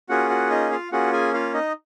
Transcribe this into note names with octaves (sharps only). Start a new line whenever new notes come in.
A#3 C#4 F4 F#4 G#4 F#5
F#4 F#5
D#4 D#5
F4 F5
A#3 C#4 F4 F#4 G#4 F#5
G#4 G#5
F4 F5
D#4 D#5